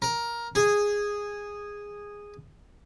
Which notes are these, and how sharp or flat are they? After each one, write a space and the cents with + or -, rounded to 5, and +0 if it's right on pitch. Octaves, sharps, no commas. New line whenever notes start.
A#4 +10
G#4 -10